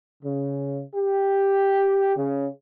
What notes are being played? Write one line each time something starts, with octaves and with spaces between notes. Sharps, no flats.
C#3
G4
C#3